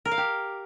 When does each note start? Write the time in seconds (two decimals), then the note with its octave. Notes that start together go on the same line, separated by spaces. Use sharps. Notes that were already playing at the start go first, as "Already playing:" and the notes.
0.05 A#4
0.11 F5
0.18 G4